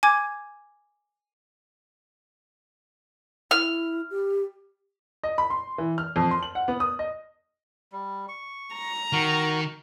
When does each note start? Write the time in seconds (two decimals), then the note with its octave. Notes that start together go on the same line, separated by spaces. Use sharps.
0.03 G#5 D6 G#6
3.51 E4 F6
4.10 G4
5.23 D#5
5.38 B5
5.50 C6
5.78 E3
5.98 F6
6.16 F2
6.31 C6
6.43 F#7
6.55 F#5
6.68 B3
6.80 D#6
6.99 D#5
7.92 G3
8.28 C#6
8.74 A#5
9.13 D#3 F#4 A#4